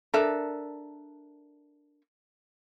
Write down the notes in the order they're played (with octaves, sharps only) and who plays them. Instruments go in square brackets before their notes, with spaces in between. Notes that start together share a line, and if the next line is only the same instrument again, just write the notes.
[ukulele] D4 A4 A#4 E5